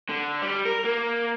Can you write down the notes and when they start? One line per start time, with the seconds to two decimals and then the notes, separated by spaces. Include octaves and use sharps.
0.09 D3
0.42 G3
0.65 A#4
0.85 A#3